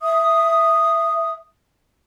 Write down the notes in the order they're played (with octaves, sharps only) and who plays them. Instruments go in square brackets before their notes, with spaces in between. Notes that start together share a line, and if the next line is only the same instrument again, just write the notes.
[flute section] E5 D#6